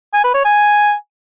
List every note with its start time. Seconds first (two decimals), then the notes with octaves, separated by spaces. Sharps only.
0.14 G#5
0.24 B4
0.34 C#5
0.45 G#5